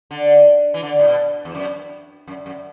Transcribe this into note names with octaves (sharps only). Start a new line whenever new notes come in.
D3
E3
D3
A2
B2
E2
F#2
F#2
F#2